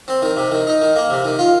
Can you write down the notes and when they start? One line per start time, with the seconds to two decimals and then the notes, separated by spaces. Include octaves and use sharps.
0.08 C4
0.22 D#3
0.37 C3
0.52 D#3
0.67 D#4
0.82 D#3
0.96 A#3
1.10 C3
1.24 D#3
1.39 F4